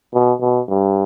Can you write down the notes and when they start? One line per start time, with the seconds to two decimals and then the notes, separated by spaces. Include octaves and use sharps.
0.14 B2
0.41 B2
0.69 G2